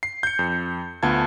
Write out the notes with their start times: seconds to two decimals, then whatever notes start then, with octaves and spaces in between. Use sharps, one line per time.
0.03 C7
0.23 G6 C#7
0.39 F2
1.03 D2 B3 F4 A5 G#6